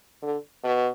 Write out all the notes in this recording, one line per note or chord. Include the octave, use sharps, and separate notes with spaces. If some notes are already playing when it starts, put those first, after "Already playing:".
D3
B2